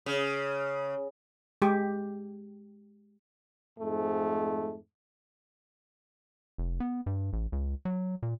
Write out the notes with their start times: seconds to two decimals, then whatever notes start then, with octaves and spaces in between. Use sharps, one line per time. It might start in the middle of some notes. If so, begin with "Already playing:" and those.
0.06 C#3
1.62 G#3 G4
3.79 F2 G#2 G#3 A3
6.58 F1
6.80 B3
7.06 G2
7.33 A1
7.52 C#2
7.85 F#3
8.23 A#2